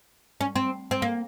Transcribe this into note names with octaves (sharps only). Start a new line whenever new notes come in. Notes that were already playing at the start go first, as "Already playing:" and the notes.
C#4
C4
C4
A#3